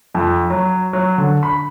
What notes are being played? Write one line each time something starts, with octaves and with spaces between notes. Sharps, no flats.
F2
F#3
F#3
D3
B5